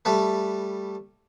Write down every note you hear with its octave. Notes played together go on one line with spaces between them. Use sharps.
G3 A3 B4